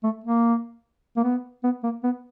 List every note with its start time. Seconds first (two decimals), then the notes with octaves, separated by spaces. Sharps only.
0.03 A3
0.24 A#3
1.16 A#3
1.23 B3
1.63 B3
1.83 A#3
2.03 B3